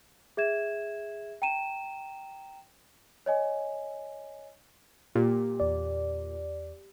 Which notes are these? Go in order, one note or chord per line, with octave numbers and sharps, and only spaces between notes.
G#4 E5 G#6 E7
G5 A#5 D#7 E7
C#5 D#5 G#5
A#2 G4
E2 D5